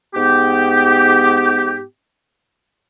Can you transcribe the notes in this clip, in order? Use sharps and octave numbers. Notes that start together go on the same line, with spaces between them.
G#2 B3 G4